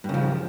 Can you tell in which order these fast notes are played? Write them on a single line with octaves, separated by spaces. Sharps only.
G2 C#3 F3